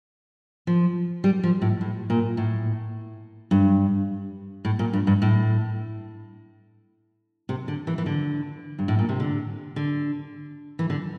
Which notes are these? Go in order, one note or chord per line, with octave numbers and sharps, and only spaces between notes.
F3
G3
F3
A2
A2
A#2
A2
G2
A2
A#2
G2
G2
A2
C3
D3
E3
E3
D3
G2
A2
A#2
C3
D3
D3
E3
D3